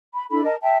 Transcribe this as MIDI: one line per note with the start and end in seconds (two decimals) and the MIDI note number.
0.14 0.25 83
0.31 0.43 62
0.31 0.43 64
0.31 0.43 69
0.31 0.43 83
0.44 0.56 70
0.44 0.56 75
0.44 0.56 81
0.62 0.77 76
0.62 0.77 79
0.62 0.77 81